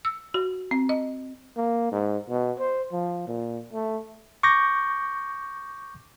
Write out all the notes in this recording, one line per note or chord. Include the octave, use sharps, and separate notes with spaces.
E6
F#4
C4
D#5
A#3
G#2
B2
C5
F3
A#2
A3
C#6 D6 G6 A#6